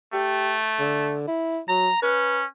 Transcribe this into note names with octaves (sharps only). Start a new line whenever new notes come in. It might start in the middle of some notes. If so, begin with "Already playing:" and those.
A3 G4
D3
E4
F#3 A#5
C#4 B4